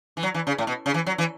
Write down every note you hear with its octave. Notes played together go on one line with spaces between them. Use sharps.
E3
F#3
E3
C#3
A2
B2
C#3
E3
F#3
E3